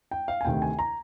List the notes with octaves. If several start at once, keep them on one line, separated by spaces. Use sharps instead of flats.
G5
F5
G#5
D2 C3 D#3 G5
G#5
A#5